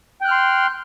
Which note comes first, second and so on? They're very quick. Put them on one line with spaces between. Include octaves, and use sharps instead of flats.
G5 F#6 F6 C6